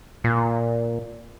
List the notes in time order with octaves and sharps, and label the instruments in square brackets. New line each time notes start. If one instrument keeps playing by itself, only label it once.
[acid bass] A#2